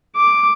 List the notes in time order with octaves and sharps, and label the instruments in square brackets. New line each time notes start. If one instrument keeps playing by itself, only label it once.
[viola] D6